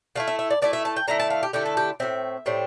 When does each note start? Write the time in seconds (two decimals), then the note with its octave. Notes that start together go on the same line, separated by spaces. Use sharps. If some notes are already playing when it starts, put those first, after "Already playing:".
0.15 D3 A3 E4 F5
0.28 E5
0.39 E5
0.50 D5
0.62 D3 A3 E4 D5
0.73 E5
0.85 A5
0.96 G5
1.08 D3 A3 E4 A#5
1.20 A5
1.30 F5
1.43 G4
1.53 D3 A3 E4 G4
1.66 A4
1.77 G4
2.00 A2 G3 C4 E5
2.46 A2 G3 C4